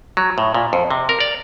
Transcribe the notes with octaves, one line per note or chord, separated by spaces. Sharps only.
F#3
A2
A#2
F2
C3
A#4
D5